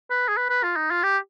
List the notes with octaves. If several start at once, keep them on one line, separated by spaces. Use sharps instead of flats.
B4
G#4
B4
B4
F4
D#4
F4
G4